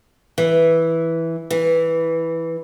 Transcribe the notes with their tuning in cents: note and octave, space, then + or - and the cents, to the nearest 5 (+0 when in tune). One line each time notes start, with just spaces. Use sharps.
E3 -5
E3 -5